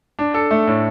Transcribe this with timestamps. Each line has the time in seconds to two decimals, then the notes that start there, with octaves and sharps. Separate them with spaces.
0.19 D4
0.34 A4
0.51 A3
0.67 A2